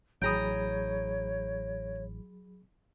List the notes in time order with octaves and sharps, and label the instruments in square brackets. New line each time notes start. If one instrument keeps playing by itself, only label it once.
[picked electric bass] A1 [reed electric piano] F#3 G#4 B5 [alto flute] C#5 [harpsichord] G5 A#5 D#6